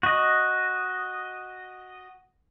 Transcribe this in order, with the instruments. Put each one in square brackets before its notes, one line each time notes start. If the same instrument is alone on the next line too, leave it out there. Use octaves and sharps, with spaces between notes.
[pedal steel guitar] F#4 D#5